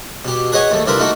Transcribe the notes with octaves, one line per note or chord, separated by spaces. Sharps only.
B2 G4
G#4 B4 C#5 D#5 F#5 G#5
D#2 A3
C2 D3 E4 F4 A#4 B4
A3 A#3 D#4 F#4